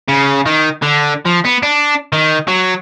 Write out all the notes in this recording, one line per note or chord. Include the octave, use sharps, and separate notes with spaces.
C#3
D#3
D3
F3
B3
D4
D#3
F#3